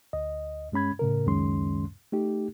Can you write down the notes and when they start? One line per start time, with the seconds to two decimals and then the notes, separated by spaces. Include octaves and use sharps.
0.13 D2 D#5
0.72 G2 G#3 C#4 B5 G#6
0.99 A2 C#3 A#4
1.26 C#2 F#2 D#3 G#3 C#4 C6
2.12 A3 D#4 G4